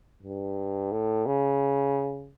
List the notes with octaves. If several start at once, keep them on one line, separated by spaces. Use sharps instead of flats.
G2
A2
C#3